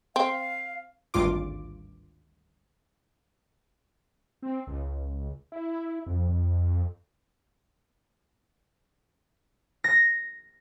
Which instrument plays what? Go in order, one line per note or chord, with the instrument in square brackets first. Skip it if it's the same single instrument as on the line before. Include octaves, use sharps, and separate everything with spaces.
[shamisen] C4 [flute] F5
[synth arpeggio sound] G#1 D2 G2 F4 D6
[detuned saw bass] C4
C#2
E4
F2
F2
[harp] A#6